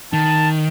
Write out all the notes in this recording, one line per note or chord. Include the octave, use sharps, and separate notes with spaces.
D#3 A5